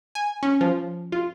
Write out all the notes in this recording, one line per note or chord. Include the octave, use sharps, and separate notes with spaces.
G#5
C#4
F3
F4